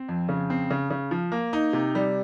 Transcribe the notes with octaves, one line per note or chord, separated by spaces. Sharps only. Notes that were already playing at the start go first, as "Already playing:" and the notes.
Already playing: C4
F2
C#3
C4
C#3
C#3
F3
A#3
D#4
C3
G3